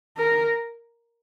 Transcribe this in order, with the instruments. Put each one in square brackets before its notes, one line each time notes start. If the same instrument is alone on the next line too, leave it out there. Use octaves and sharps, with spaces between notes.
[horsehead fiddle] A#4